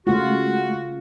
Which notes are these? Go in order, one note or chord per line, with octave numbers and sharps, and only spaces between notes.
C#3 G#3 A3 F4 F#4